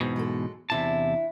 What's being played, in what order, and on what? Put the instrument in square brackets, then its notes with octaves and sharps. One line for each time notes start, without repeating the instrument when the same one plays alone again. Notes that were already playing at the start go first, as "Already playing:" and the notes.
[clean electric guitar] E2 G#2 B2 [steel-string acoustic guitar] C4
[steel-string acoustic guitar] F#3 G#3 A4
[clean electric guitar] E2 C3 A5 [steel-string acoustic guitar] D4 E4